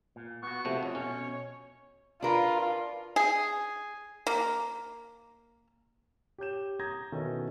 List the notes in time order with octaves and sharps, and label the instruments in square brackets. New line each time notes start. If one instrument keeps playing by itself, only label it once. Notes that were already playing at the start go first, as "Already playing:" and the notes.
[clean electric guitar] A#2
[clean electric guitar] B3 F#4 [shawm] C#6
[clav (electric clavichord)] C3 F3 A3
[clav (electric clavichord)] F2 [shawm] C#5
[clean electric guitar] B2 [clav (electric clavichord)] C#4
[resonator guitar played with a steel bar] D4 A#4 B4 [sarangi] F4
[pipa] G#4
A#3
[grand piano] G4 C#5 G6 E7
A#5 D#6 G6 G#6 A#6
B2 D#3 E3 C#4 A4